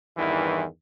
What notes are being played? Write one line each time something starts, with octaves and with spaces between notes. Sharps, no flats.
E2 G2 D#3 E3